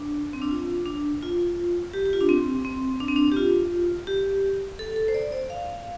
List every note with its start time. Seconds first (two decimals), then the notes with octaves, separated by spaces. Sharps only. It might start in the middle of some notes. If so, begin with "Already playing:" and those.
Already playing: D4
0.33 C4
0.42 D4
0.51 F4
0.86 D4
1.22 F4
1.94 G4
2.06 G4
2.13 F4
2.20 D4
2.29 C4
2.65 C4
3.00 D4
3.08 C4
3.16 D4
3.32 G4
3.37 F4
4.07 G4
4.79 A4
4.96 A4
5.08 C5
5.14 D5
5.32 D5
5.50 F5